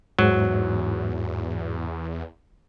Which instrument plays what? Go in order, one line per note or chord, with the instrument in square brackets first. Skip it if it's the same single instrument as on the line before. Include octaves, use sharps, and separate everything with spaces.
[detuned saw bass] E2 [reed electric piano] G#2 [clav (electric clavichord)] F#3